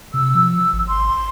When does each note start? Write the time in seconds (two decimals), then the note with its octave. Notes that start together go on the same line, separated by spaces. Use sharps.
0.14 C3 E6
0.35 F3
0.73 G#1
0.88 C6